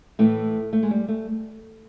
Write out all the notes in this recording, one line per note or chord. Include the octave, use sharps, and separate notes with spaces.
A2 E3 A3
A3
G#3
G3
A3